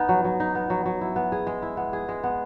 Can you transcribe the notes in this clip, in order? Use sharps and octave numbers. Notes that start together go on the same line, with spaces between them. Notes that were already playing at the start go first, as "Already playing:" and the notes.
Already playing: B3 D#4
F#3
F#3
D#4
B3
F#3
F#3
E4
B3
G#4
G#3
E4
B3
G#4
G#3
B3